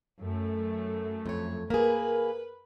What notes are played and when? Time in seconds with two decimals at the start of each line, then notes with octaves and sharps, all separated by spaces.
0.19 F#2 A3
1.26 F2 C#5
1.70 A#3 G#4 A#4 B4